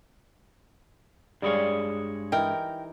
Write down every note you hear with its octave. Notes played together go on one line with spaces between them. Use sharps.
G2 G3 G#3 G#4 C#5 F5
E3 D#4 A#4 G5